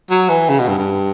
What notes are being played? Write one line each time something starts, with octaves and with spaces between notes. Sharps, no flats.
F#3
E3
C#3
B2
G2
G2